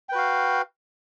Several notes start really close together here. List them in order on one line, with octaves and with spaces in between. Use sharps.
G5 B4 F#4 F5